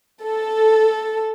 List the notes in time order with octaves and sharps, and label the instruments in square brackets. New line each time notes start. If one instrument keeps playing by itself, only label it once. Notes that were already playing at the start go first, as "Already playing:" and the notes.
[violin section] A4